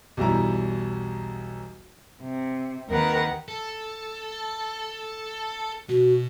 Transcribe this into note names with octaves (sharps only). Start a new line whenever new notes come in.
B1 E2 G3 E4 A#5
C3
D#2 D#3 A#4 B4 F#5 A#5
A4
B2 F#4